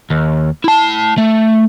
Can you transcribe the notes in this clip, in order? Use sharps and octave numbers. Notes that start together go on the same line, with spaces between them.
D#2
E4 A5
A3